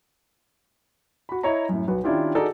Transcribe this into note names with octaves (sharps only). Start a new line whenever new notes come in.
F#4 B5
E4 C#5 D#5 A#5
F#2 A2
B1 F#4 B4
D#3 C#4 D4 E4 F4 G4
D#4 F#4 G#4 A4 D5 A#5